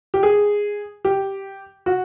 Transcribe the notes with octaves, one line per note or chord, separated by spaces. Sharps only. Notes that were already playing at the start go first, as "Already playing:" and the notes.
G4
G#4
G4
F#4